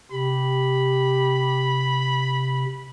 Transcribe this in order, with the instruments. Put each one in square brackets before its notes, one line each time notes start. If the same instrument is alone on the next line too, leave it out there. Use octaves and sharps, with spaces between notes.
[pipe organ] C3 [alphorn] G4 [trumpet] B5